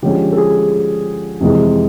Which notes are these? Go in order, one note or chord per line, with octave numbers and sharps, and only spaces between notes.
D3 F3 G#3 C#4 G4
A4
G#4
F2 C3 E3 G#3